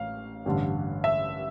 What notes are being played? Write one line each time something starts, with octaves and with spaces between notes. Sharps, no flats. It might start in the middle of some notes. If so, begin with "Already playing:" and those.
Already playing: A1 A2 F5
A1 G2 D3
E5